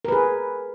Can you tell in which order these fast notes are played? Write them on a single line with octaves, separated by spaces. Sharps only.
A#4 B4 G#4